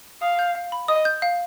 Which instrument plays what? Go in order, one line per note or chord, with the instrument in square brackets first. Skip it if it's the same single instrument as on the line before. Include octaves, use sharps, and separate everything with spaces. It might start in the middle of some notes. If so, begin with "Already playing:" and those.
[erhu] F5 [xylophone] D#6
[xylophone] G6
F5
B5
[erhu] D#5 [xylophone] D#6
[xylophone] G6
F5